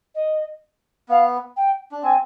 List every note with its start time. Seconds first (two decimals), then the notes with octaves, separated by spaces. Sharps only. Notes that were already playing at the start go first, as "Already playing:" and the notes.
0.14 D#5
1.09 B3 F5
1.56 G5
1.92 D4
2.03 C4 G#5